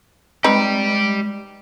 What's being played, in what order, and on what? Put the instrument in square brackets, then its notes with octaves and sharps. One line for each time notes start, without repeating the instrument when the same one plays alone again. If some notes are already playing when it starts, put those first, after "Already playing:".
[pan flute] G#3 [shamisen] C4 D#4 B4 [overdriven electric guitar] G4 D5